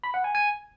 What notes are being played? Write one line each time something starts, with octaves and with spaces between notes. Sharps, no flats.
B5
F#5
G#5
G#5